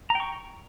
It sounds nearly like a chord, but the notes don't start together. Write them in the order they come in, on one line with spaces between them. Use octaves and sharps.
A#5 G5 C#6